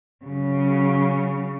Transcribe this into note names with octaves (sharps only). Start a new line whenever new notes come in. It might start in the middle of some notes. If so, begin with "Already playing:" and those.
C#3 F#3 C#4